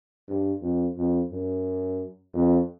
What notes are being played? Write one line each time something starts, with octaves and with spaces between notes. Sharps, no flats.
G2
F2
F2
F#2
F2